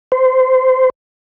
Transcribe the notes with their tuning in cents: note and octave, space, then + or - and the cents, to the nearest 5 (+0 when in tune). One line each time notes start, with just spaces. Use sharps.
C5 -20